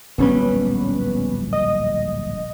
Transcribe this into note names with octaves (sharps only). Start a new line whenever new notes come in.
D1 A#1 G3 B3 C#4 B4
D#5